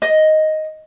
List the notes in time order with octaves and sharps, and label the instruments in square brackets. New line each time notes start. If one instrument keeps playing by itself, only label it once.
[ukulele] D#5